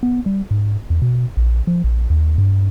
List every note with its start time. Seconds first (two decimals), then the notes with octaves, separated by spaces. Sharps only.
0.03 B3
0.26 G3
0.51 G#2
0.90 E2
1.02 B2
1.37 A#1
1.67 F3
1.84 A#1
2.10 D#2
2.38 G2